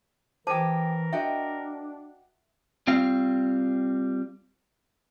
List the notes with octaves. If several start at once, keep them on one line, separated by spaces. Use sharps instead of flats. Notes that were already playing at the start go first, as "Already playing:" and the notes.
E3 G4 G#4 A#4 C5 A5 D6
D4 F#4 D#5 E5 G5
G3 C4 F4 F5